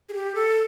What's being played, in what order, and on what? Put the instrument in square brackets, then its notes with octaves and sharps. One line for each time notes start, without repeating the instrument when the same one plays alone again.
[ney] G#4
G4
A4